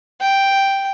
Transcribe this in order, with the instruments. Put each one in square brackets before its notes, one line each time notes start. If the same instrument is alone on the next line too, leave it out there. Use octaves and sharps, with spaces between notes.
[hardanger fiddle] G5